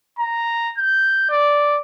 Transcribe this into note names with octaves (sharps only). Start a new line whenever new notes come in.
A#5
G6
D5